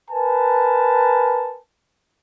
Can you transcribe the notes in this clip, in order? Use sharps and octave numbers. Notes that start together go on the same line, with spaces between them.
A#4 B4 G#5 A5